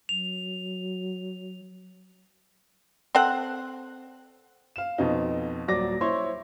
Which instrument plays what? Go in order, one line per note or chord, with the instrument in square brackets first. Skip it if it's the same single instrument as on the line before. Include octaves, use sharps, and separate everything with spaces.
[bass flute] F#3 [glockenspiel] F7
[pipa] C4 A4 F#5
[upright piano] F5 E7
F2 B2 D#4
D#1 F#3 D5 D6 A#6
E4 C5 C#5 C6 C#6